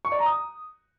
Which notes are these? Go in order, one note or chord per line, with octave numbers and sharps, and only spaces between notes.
C#6
D5
A#5
D#6